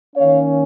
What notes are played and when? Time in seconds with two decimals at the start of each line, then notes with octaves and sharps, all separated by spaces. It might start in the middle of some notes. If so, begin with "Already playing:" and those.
0.16 D#3 A#3 C#4 C#5 F5